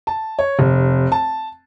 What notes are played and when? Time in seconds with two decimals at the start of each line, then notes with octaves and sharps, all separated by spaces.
0.07 A5
0.39 C#5
0.59 F1
1.12 A5